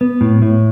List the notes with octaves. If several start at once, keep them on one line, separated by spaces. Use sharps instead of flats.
B3
A2
A2